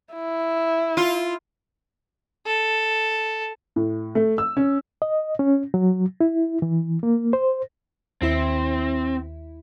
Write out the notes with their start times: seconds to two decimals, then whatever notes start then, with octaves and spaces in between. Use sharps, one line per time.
0.13 E4
0.97 F4
2.46 A4
3.76 A2
4.15 A3
4.38 E6
4.57 C#4
5.02 D#5
5.39 C#4
5.74 F#3
6.21 E4
6.62 E3
7.03 A#3
7.33 C5
8.22 D#2 C4 E4